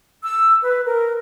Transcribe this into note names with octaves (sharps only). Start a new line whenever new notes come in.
E6
B4
A#4